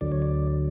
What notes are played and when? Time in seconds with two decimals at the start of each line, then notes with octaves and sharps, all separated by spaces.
0.01 D2 D3 F#3 D5
0.12 C#5
0.22 D5